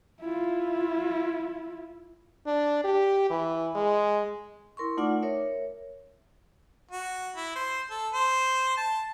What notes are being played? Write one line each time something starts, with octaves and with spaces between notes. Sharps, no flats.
E4 F4
D4
G4
E3
G#3
E4 A#4 C6 C#6
A3 D#4 F4 D5 F#5 D6
A#4 C#5 E5
F#4
E4
C5
A4
C5
A5